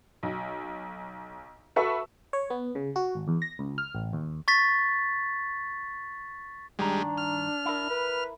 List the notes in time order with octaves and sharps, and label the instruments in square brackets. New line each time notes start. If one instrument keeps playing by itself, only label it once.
[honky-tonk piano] B1
F#4 A4 B4 E5 C#6 E6
[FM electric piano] C#5
B3
C#3
F#4
G#1
E2
A#6
C#2
F6
A1
D#2
[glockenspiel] C#6 A6 B6
[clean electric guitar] G2 D#3 A#5 [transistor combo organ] G3 G#3 [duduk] D4
[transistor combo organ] F6
[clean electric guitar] E4 A#4
[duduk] B4